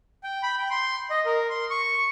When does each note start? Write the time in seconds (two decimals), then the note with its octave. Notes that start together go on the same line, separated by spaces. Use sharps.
0.24 G5
0.43 B5
0.58 G5
0.71 C6
1.10 D#5
1.26 A#4
1.50 C6
1.70 C#6